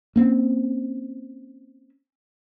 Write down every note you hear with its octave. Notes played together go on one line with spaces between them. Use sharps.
A#3 C4 C#4